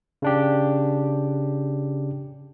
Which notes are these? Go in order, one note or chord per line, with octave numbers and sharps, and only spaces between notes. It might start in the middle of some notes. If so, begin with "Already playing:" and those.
C#3 D4 G4